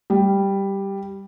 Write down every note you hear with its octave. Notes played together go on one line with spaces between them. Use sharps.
G3